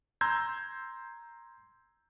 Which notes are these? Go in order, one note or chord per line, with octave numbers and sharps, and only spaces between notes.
A#5 C6 E6 G6 G#6